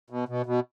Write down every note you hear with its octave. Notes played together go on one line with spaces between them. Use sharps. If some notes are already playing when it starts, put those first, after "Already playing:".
B2
B2
B2